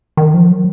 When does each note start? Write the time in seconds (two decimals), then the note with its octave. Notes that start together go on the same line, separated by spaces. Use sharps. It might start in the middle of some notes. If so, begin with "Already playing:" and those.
0.17 D#3
0.34 F3
0.50 F#3